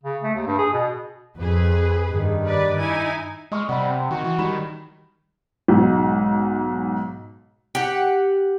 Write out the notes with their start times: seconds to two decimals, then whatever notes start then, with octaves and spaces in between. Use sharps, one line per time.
0.04 C#3
0.23 A3
0.35 D#2
0.47 G2
0.58 G#4
0.73 B2
1.38 F2 G#4 B4
2.07 G2 D#3
2.44 G4 B4 D5
2.78 D#4 E4 G#5
3.52 G#3 D#5 C#6 F6
3.69 C3 G3 F#5 B5
3.89 C4
4.11 D#3 F#4
4.24 E3
4.38 D#3 G3 B5 E7
5.68 B1 G#2
7.75 G4 F#5